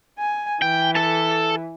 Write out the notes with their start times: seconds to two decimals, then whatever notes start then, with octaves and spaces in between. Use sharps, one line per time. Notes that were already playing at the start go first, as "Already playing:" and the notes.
0.19 G#5
0.62 E3 G5
0.95 A4 A5